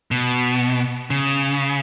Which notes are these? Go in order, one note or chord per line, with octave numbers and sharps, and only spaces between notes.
B2
C#3